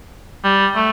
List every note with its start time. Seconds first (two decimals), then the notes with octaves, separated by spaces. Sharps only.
0.44 G3
0.75 A3